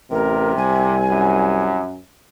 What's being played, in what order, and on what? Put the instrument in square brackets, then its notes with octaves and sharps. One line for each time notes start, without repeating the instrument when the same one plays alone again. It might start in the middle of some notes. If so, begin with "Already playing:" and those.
[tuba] A1 [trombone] C3 [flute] A#4
[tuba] C2 [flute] G#5
[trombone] F#2